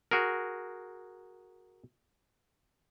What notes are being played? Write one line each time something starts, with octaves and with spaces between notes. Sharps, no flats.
F#4 G#4 A#4